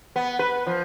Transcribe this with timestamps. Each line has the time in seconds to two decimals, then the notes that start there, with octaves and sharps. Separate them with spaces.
0.16 B3
0.39 B4
0.67 F3